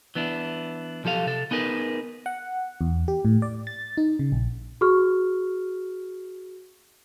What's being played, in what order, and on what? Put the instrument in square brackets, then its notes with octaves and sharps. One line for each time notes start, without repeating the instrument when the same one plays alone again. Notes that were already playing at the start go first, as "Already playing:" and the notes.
[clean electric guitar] E3 B3 D4 E4
B1 F3 G4 A4 F5
C3 A4
B3 D#4 G#4 A#4 B4
[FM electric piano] F#5
E2
G4
A2
D5
A6
D#4
C#3
A#1
[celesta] F#4 G#4 C#6 F6